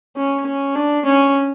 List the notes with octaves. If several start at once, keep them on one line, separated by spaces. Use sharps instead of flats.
C#4
C#4
D4
C#4